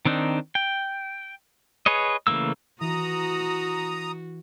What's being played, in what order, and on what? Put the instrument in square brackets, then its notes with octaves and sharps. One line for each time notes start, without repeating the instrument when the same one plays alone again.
[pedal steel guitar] D#3 C4 D4 D#4
G5
G#4 B4 C#5 D#5
C#3 E3 A3 A#3 E6
[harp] E3 [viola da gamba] F#4 [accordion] A#5 D#6